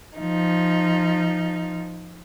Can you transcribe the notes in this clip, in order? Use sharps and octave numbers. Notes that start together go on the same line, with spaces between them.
F3 D#4